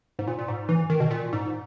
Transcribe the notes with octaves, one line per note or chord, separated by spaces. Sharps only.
G#2
A#2
A#2
G#2
E3
D#3
B2
A#2
G#2